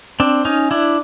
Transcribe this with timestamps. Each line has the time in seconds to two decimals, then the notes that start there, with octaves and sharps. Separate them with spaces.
0.20 C4 D4
0.45 C#4 D#4
0.71 D4 E4